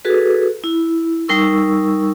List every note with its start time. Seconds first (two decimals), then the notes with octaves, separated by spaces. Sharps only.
0.05 F#4 G#4 A4 B4
0.64 E4
1.28 G3 D#4 A#4 C#6 E6